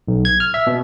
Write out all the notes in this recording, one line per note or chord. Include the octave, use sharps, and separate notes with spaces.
B1
G#6
F6
E5
B2